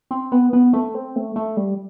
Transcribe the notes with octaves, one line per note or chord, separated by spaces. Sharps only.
C4
B3
B3
A3
C4
A3
A3
G3